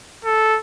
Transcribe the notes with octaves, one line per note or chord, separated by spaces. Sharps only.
A4